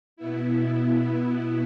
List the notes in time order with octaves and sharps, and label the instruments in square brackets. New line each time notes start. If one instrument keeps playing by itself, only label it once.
[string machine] B2 B3 E4